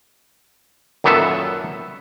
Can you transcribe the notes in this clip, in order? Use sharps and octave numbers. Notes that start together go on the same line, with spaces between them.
F#2 A#2 D#3 B3 A4 E5